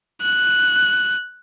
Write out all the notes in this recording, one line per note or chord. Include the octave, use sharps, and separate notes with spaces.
F#6